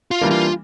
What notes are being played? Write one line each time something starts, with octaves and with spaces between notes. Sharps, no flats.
F4
E3 G3 A#3 D4
F4